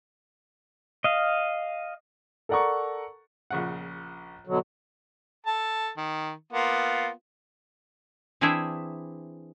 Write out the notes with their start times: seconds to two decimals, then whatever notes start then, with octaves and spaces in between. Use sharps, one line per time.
1.04 D#5 F5
2.49 A4 A#4 D5 F#5 A#5 C#6
3.50 A#1 C#3 F#5
4.47 B2 D3 F#3
5.47 A4 A5
5.97 D#3
6.53 A#3 B3 F4
8.41 E3 C4 D4 E4 G#4 E5